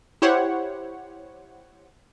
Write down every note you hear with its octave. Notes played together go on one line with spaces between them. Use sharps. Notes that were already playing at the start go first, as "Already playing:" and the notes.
E4 G4 C5 C#5 F#5